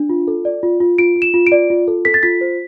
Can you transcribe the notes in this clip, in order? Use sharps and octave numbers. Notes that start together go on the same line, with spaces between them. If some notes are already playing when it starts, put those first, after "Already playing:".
Already playing: D4
F4
A4
D5
F4
F4
F4 D7
F4
E7
F4
D7
D5
F4
A4
A4 B6
A6
F4 B6
C5